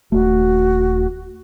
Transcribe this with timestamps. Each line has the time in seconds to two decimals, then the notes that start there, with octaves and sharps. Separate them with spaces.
0.12 D#1 A3 F#4